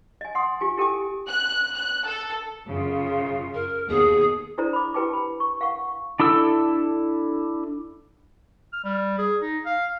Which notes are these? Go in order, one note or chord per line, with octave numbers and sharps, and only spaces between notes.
D#5 G#5
F#5 C6 D#6
F4 G4 G#5
E4 G4 A4 G5 G#5 D6
F#6
F#6
A4
F#2 C#3 F4
A#4
D#2 B2 G#4
D4 E4 A4 C5 D5 A#5
B5 D6
E4 G4 B4 G5 A5 D6
B5
C#6
F5 F#5 C#6
D4 E4 A4 E6
F6
G3
G#4
D#4
F5